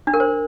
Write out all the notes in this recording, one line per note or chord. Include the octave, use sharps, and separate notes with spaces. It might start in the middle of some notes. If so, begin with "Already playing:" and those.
D4
A#4
C5